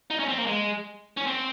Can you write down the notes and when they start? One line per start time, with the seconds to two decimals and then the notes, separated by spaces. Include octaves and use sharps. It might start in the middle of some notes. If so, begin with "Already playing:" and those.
0.10 D#4
0.20 C#4
0.28 C4
0.38 A#3
0.47 G#3
1.17 C#4
1.26 C4